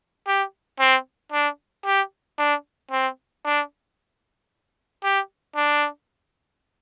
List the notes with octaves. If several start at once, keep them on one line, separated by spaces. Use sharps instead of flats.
G4
C4
D4
G4
D4
C4
D4
G4
D4